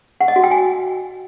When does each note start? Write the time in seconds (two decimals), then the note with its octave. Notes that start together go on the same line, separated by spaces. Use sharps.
0.21 F#5
0.28 D#5
0.36 F#4
0.44 G5
0.51 G#5